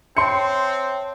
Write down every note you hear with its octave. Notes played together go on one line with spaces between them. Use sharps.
C4 C#5 E5 A5 C6 C#7